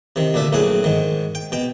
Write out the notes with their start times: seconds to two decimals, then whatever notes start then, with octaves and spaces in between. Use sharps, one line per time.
0.16 C3 D#3
0.34 D2 A#2 D4 E5
0.53 A#1 A2 F#3 G#4 F#5
0.84 G#2 D#3
1.35 G5
1.52 B2 G5